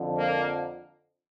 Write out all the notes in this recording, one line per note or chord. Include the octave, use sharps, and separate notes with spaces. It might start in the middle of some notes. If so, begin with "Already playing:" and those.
Already playing: F2 D3 F3
A#3